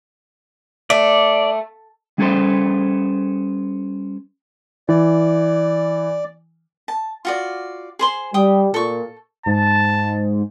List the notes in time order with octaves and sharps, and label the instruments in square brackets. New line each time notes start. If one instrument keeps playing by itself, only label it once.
[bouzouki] A3 [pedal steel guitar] D5
[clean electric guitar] G3 C#4 G#4 A4 B4 C5
[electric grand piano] E3 [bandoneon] D5
[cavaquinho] A5
F4 F#4 D5
G#4 C5 C6
[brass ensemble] G3 [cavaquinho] G5 D#6
[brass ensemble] A#2 [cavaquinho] A4 C#6
[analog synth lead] G#2 [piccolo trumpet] A5